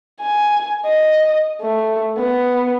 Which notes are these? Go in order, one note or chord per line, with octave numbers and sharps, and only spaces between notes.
G#5
D#5
A3
B3